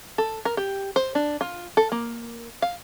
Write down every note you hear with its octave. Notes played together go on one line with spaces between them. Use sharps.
A4
A#4
G4
C5
D4
F4
A4
A#3
F5